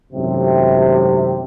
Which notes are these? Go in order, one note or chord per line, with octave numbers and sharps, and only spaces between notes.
G#1 F#2 A2 C3